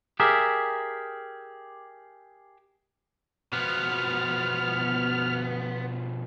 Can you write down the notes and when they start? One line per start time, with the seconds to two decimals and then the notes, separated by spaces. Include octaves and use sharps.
0.20 G4 G#4 A#4 E5
3.53 B2 F3 B3 F6